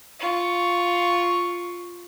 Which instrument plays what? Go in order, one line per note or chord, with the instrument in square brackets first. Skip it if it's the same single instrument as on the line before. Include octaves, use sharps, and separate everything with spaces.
[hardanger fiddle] F4 C#6